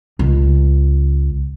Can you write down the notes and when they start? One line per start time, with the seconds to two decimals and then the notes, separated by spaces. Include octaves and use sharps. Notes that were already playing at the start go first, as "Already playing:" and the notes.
0.19 C#2